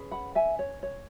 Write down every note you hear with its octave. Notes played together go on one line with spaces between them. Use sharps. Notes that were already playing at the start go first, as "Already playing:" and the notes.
Already playing: C#4 G#4 B4
F#5 B5
E5 G#5
C#5
C#5